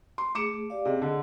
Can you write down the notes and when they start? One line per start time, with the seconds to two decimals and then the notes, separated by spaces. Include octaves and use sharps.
0.18 C6
0.35 A3 G#4 D6 C#7 E7
0.70 G4 D5 F5
0.85 C3 G#4 D#5
1.02 D3